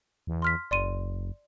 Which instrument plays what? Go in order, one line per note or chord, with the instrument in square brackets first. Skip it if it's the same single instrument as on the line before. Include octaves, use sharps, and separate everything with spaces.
[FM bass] E2
[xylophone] C6 F6 B6
[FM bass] F#1 [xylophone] D5 C6 D#7